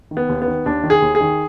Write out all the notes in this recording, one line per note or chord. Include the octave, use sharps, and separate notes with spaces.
D#3
B3
D#2
B3
D#3
D#2 D4
D#3
G#4
D#2
G#4
D#3